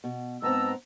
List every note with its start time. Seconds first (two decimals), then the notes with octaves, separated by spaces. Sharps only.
0.04 B2
0.42 G#2 B3 C4 A5 A#5 E6